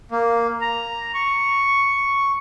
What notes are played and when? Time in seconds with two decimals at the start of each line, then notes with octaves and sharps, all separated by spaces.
0.11 A#3
0.61 A#5
1.14 C#6